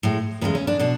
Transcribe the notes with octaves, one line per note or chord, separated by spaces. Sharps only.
A2 G#3
E2 C#3 G#3 B3
C#4
D4
B2 D4